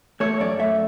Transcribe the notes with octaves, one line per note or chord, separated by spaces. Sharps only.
A3 C#5
F#2 D5
A3 E5